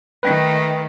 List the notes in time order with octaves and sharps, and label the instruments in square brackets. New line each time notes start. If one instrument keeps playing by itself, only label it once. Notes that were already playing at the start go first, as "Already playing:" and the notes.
[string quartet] D#3 A3 [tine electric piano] B4 G5